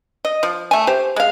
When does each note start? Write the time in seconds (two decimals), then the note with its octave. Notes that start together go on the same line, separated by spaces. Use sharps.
0.25 D#5
0.43 F3
0.71 A3 G#5
0.87 G4 C5
1.16 G#3 F5